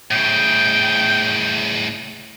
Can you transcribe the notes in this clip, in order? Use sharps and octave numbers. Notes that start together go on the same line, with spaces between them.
A2 C#3 G5